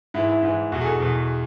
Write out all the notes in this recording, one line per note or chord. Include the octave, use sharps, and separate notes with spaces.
G#2 E3 E4
E4
G#2
E3
E2 B2 F#4
G#4
A4
E2 B2